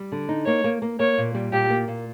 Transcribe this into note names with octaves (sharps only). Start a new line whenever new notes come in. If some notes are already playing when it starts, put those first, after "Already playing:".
Already playing: G3
D3
D#4
A#3 C#5
A#3
A#3
A#3 C#5
A#2
G3
A#2 G4
A#3
A#2